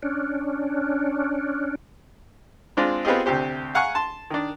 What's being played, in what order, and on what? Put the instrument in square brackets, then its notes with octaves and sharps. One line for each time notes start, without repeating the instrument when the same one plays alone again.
[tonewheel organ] C#4 D4
[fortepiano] G#3 C4 D4 F4
B3 C4 F4 G4 G#4 D#5
D2 C3 G4 C5
F5 F#5 G#5 A#5 C#6
A5 C6
D#3 D4